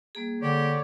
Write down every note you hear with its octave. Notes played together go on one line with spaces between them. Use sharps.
G3 A#3 G#4
D3 G4 C#5 D5